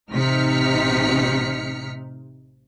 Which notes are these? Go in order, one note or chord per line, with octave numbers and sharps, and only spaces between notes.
A1 C3 D#4 F6 B6 C#7